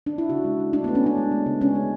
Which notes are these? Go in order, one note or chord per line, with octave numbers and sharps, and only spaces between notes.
D4
E4
C#3 F#4
G#3
G#3
A3 D4
B3
A3
C#4
A3 D4
G#3
G#3
C#3
G#3 C#4
G#3